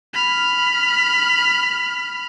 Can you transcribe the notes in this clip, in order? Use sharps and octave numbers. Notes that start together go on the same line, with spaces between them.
B5 F6